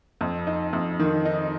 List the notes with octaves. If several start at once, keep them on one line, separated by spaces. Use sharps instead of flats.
F2
D#4
F2
D#3
D#4